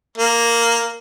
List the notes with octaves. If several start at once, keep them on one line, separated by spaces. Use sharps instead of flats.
A#3